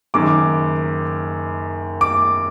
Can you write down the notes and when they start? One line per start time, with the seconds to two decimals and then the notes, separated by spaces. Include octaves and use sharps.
0.14 F#1 F#2 D#3 D6
2.01 D6